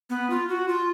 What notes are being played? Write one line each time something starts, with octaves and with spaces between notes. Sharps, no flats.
B3
F4
F#4
F4